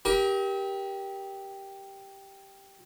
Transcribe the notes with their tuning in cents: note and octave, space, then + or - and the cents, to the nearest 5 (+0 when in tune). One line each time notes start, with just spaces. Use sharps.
G4 +0 A#4 +30 D#6 +45